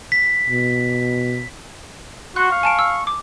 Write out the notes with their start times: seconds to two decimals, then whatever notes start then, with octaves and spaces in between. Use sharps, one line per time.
0.12 B6
0.48 B2
2.36 F#4 F#5 C6 C#6 F#6
2.52 F5 C#6
2.63 G#5 A5 D7
2.79 E6
3.07 D6